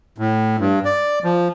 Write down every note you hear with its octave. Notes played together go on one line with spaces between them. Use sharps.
A2
G2
D5
F3